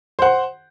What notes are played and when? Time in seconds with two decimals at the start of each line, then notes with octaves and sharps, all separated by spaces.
0.19 C5
0.22 F#5
0.25 C6